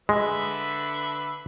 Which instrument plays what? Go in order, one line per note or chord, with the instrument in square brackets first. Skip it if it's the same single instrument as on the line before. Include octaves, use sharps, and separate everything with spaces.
[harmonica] D3 B4 E5 [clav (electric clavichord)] G#3